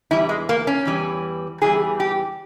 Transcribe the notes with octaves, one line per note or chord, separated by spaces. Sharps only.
E2 E3 G3 E4
G#3
A#3
C#4
E2 E3 G3
E2 E3 G3 G#4
G4